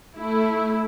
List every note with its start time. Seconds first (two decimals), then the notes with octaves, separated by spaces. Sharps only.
0.15 A3 E4